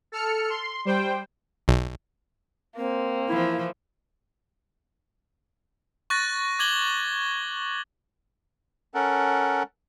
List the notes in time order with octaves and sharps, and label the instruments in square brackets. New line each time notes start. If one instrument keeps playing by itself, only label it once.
[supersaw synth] A4 F6 C#7
C6
G3 C5 G5
[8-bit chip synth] B1
[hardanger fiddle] A#3 [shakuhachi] C4
[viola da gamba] E3 F3 [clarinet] E4
[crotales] C#6 F#6 A6 A#6
D6 G#6 F#7 G7
[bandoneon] C#4 A4 A#4 F#5